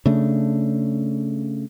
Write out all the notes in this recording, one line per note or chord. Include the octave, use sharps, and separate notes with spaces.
C#3 A3 D4